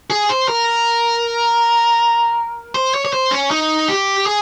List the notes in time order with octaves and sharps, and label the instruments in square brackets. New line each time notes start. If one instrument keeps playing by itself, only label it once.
[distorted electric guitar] G#4
C5
A#4
C5
C#5
C#5
C5
C#4
D#4
G4
G#4